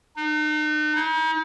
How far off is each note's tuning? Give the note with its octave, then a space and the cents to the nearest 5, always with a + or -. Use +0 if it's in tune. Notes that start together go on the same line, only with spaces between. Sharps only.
D#4 -40
D#4 +45